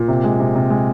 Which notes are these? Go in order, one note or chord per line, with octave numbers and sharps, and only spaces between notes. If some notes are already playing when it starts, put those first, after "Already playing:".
Already playing: A#2
C3
G#3
C3
C3
G#3